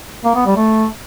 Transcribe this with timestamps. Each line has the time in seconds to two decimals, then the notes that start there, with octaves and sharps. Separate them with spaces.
0.25 A#3
0.35 B3
0.46 G3
0.57 A3